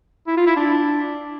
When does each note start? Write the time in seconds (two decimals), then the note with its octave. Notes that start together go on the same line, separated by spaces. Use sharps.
0.27 E4
0.37 F4
0.47 E4
0.56 D4